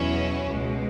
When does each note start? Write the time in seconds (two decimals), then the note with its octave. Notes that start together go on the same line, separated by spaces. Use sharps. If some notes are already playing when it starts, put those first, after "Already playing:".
Already playing: E2 B2 F#3 C#4 E4
0.46 C#2 B2 G#3